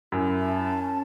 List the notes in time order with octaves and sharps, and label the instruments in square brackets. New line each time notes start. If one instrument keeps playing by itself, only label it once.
[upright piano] F#2 [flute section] E4
[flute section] A5
C#4